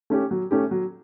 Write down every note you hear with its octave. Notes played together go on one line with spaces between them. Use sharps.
A3 C#4 G4
F#3
A3 C#4 G4
F#3